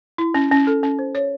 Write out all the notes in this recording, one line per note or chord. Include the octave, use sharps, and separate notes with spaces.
E4
C#4
C#4
A4
C#4
C5
C#5